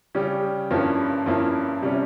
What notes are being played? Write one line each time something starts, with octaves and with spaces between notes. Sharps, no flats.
C#3 G3 C#4 G4
G2 F3 A#3 C#4 E4
G2 F3 A#3 C#4 E4
C3 G3 C#4